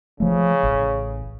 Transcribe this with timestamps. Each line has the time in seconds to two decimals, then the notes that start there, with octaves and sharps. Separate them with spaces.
0.20 C#3 F3 A3
0.63 A1